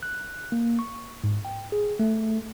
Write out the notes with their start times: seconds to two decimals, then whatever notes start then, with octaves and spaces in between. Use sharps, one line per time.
0.03 F#6
0.52 A#3
0.79 C#6
1.24 G#2
1.45 G5
1.72 G#4
1.99 A3